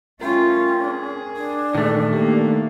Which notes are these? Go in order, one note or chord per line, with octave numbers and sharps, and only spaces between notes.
A3 C#4 F4 A#4 G5 C6
G#4
D4
A#2 D#3 E3 G#3 A3
A#3 D4 G4